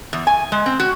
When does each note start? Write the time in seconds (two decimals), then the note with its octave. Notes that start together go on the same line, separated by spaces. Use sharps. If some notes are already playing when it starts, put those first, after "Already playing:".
0.13 E2
0.27 G#5
0.52 G#3
0.66 C4
0.80 F#4